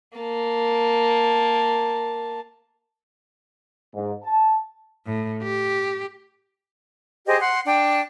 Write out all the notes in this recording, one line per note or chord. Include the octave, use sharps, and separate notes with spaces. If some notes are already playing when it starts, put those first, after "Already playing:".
A#3 A5
G#2
A5
A2
G4
G4 G#4 C5 D#5
F#5 C6
D4 G5